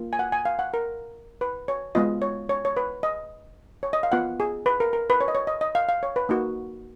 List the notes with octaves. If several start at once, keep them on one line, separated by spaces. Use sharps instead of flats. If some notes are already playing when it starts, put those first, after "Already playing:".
Already playing: A#3 F4
G#5
F#5
G#5
F5
F#5
A#4
B4
C#5
G#3 B3 F4 D#5
C#5
C#5
C#5
B4
D#5
C#5
D#5
F5
B3 F4 F#5
G#4
B4
A#4
A#4
B4
C#5
D#5
C#5
D#5
D#5
F5
F5
C#5
B4
A#3 D#4 F#4